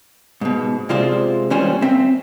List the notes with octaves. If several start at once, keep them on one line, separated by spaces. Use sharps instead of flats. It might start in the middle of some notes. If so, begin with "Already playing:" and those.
G#2 B2
C3 G#3 F4 C5 D5
D#2 G3 C#4 C5 G#5
C4 E5